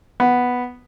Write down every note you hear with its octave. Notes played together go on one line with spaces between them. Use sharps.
B3